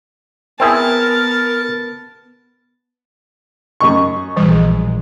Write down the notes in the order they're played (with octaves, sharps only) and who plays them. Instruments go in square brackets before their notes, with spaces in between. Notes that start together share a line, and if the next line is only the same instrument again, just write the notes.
[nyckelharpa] B3 A5 [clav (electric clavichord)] C4 E4 G#4 [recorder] A#4
[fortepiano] F#2 D#5 C#6
[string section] A#1 G#3 [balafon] E3 G3